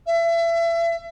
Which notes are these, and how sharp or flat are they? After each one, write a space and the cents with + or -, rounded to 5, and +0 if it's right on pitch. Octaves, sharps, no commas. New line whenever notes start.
E5 +30